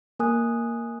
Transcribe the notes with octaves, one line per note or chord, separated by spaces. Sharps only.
A#3 A#4 G#5 D#6 F#6